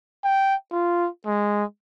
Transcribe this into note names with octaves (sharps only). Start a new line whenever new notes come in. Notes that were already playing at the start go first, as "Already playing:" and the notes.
G5
F4
G#3